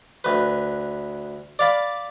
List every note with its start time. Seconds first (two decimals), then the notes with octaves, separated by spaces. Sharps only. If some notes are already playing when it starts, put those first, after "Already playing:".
0.24 D2 B4
1.59 D5 F5 B5